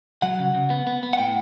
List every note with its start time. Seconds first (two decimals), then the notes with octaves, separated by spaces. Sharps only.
0.22 F#3 F#5
0.39 C#3
0.54 C#3
0.70 B3
0.87 B3
1.03 B3
1.13 F#5
1.18 A2 G5